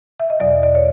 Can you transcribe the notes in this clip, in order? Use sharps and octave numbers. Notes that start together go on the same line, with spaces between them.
E5
D#5
E2 B2 F#3 D5
D5
C#5